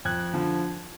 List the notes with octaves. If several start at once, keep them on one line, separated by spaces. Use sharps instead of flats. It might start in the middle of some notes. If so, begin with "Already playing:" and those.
F2 F#6 G#6
D3 F3